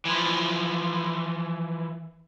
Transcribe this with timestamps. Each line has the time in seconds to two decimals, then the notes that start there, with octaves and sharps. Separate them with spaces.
0.05 E3 F3